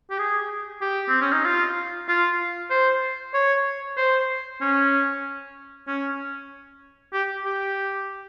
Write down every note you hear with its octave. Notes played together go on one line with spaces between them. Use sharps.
G4
G#4
G4
C4
C#4
D#4
F4
F4
C5
C#5
C5
C#4
C#4
G4
G4